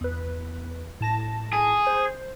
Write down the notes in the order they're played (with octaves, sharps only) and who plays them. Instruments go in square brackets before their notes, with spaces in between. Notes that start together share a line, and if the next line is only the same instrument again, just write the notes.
[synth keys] E2 B4
A2 A5 A#6
[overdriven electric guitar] G#4
[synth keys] C5